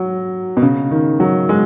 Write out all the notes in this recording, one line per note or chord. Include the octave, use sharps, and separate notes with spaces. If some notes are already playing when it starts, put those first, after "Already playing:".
Already playing: F#3
B2
C#3
D#3
F#3
G#3